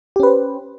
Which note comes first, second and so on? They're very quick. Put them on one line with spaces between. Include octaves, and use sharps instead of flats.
G4 C#4 B4 C5